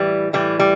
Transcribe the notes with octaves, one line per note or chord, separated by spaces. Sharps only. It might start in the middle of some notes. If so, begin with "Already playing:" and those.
Already playing: A2 E3 G3
A2 E3 G3
G3